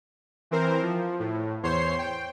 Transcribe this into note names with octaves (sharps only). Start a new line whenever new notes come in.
E3 C4 A#4 C5
F3
A2
E2 C5 C#5 C6 C7
G5